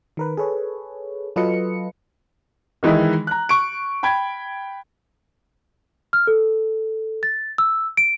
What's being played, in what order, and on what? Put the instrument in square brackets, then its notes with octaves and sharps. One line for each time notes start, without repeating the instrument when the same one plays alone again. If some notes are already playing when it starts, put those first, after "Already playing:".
[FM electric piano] D#3 A#4 B4
G#4 A4 B4 C#5
F#3 F4 A4 B4 D#5 C#7
[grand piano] D#3 E3 G#3 D#4 E4
A#5 F#6
C#6 D7
G5 B5 G#6 D7
[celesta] F6
A4
A6
E6
D7